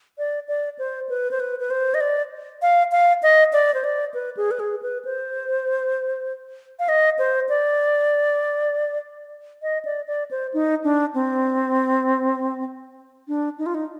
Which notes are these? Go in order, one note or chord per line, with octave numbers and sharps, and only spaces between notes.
D5
D5
C5
B4
C5
B4
B4
C5
D#5
D5
F5
F5
D#5
D5
C5
D5
B4
G#4
B4
G#4
B4
C5
F5
D#5
C5
D5
D#5
D5
D5
C5
D#4
D4
C4
D4
D#4
F4
D#4